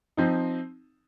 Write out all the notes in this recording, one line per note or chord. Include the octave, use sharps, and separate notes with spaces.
F3 C4 D#4